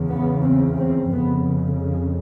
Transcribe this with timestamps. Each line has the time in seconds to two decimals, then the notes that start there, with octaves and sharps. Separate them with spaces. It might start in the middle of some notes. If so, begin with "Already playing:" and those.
Already playing: E2 C#3
0.09 B3
0.43 C4
0.77 C4
1.11 F2 C#3 B3